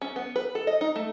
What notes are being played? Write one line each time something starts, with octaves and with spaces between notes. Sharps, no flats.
C#4
B3
B4
A4
D#5
D#4
A3